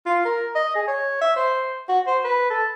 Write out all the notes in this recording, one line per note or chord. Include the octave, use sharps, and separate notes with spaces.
F4
A#4
D#5
G#4
C#5
E5
C5
F#4
C5
B4
A4